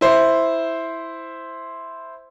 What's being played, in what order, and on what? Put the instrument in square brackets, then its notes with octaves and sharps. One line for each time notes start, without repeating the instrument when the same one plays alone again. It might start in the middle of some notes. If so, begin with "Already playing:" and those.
[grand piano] E4 C5